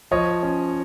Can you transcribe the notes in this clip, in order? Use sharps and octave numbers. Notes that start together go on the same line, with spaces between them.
F3 C#5 D#5
C#4